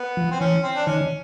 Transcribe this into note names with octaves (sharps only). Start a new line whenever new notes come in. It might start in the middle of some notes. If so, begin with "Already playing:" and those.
Already playing: B3
F3
C4
E3 C#4
C4
D4
D#3 C#4